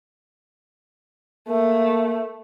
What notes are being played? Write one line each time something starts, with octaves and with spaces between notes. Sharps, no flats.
A3 A#3